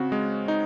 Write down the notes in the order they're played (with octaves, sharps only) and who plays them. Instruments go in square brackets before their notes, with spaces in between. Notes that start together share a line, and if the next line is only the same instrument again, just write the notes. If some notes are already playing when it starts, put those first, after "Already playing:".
Already playing: [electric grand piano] C#3 F#4 [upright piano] C4
[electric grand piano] G#3
D#4